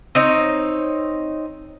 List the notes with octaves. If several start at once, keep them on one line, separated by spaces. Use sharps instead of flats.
C4 D#4 C#5